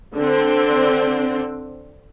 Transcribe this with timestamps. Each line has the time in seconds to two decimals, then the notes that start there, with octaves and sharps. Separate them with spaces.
0.15 D3 C4